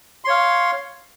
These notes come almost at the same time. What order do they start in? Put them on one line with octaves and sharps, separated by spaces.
C6 C#5 F5